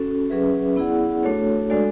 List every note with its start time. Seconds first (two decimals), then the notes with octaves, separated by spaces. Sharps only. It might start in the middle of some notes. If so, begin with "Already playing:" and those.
Already playing: C#4 F#4 A4
0.30 F#3 C#4 G#4 B4 E5
0.76 B3 E4 G#4 D5 F#5
1.23 A3 D4 F#4 A4 C#5
1.70 G#3 D4 F#4 A4 D5